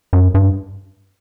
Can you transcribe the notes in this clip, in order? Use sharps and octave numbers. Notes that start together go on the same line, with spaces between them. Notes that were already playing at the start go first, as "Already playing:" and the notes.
F#2
G2